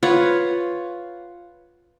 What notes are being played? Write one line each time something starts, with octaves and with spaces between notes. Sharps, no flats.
F4 B4 C#5 F#5